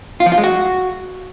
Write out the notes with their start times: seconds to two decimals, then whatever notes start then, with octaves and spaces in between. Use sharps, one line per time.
0.20 F4
0.26 F3
0.32 F4
0.38 G#3
0.43 F#4